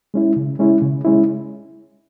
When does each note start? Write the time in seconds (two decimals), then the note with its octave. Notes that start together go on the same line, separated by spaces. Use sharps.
0.14 G#3 C#4 E4
0.36 C#3
0.59 G#3 C#4 E4
0.82 C#3
1.04 G#3 C#4 E4